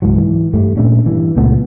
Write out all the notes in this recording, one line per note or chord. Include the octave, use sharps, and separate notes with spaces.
C#2 G#2 E3 F#3
E3
G2 G3 A3
A#2 A3 C#4 D4
G2 E3
C#2 A#2 A3 B3